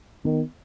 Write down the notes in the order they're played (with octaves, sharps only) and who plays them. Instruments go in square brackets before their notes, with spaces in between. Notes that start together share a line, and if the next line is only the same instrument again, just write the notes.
[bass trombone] D#3 [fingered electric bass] B3